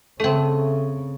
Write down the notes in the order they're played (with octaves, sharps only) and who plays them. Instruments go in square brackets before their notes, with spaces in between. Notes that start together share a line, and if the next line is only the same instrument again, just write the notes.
[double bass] C#3 [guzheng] A3 C4 [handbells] A4 E5